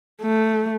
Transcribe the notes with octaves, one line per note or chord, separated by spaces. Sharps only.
A3